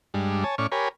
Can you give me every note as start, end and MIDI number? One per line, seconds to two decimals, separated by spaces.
0.14 0.44 43
0.14 0.44 55
0.14 0.44 56
0.14 0.44 62
0.44 0.55 73
0.44 0.55 80
0.44 0.55 81
0.58 0.67 45
0.58 0.67 61
0.58 0.67 74
0.58 0.67 85
0.58 0.67 89
0.72 0.88 67
0.72 0.88 70
0.72 0.88 73
0.72 0.88 80
0.72 0.88 83